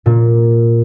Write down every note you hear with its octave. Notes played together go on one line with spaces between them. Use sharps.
A#2